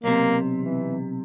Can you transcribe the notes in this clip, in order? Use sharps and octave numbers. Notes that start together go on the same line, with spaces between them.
B1 C3 A#3
E3